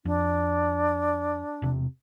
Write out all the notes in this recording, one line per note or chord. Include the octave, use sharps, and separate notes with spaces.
F2 D4
E1 C3